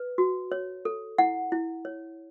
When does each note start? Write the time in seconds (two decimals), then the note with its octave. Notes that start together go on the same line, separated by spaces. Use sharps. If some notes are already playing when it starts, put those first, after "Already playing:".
Already playing: B4
0.18 F#4
0.52 C#5
0.85 A4
1.18 E4 F#5
1.52 E4
1.85 C#5